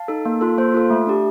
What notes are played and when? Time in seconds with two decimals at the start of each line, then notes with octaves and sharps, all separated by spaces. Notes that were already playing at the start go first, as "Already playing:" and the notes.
Already playing: F5 A5
0.08 D#4 A4
0.25 A#3
0.41 F4 A4
0.58 A#3 C5
0.74 F4 A4
0.90 A3
1.07 D4 G4